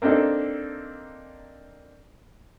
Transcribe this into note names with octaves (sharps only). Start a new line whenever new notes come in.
A#3 C4 D4 D#4 A4